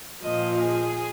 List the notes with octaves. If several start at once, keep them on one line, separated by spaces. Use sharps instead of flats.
A#2 F3 D#5
G#4